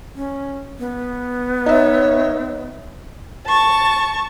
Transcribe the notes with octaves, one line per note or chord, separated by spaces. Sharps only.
C#4
B3
D#4 C#5 E5
A5 C#6